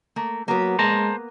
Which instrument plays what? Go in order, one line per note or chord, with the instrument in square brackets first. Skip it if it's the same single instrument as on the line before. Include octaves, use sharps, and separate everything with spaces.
[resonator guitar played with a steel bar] A3 A#3
[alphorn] F#3 [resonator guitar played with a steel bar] A#3 B3 B4
[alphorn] G#3 [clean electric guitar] C5 A5 A#5